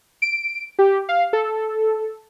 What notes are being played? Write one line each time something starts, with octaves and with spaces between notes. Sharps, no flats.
D7
G4
F5
A4